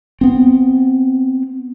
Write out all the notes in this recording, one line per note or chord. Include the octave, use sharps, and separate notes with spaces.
B3 C4